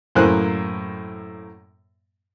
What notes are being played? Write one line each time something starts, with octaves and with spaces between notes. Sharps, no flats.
F#2 A2 A#3 C5 G#5 F#6